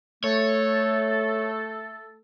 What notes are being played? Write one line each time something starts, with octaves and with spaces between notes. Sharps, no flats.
A3 A4 C#5